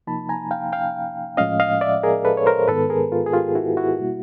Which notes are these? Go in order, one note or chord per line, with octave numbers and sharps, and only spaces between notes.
C3 F3 A#3 D#4 A5 B5
G#5 A#5
F5 G5
F5 G5
A2 F3 G#3 C#4 D#5 F5
D#5 F5
D5 E5
G#4 A#4
A4 B4
C#5
A#4 C5
G#2 D#3 G#3 B3 A4 B4
G#4 A#4
F4
G#4
F4 G4
E4 F#4
E4 F#4
B2 G3 A#3